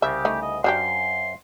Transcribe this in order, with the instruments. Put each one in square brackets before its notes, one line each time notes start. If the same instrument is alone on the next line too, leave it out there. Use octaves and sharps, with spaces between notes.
[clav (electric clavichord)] C2 C#3 [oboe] G4 [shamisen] E5
[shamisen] A3 D#4
[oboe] D#5
[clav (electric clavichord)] F#2 C5 F5 [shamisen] F#3 D4 G4 [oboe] C6